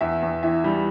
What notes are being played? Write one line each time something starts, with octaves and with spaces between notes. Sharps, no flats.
E2 E5
E2
E3 E5
G3